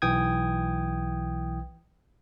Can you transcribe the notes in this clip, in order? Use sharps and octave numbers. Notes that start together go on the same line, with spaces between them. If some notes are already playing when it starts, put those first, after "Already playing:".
B1 E3 G5 D#6 G#6